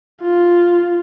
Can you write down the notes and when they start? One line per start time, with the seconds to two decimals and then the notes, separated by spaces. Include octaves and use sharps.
0.22 F4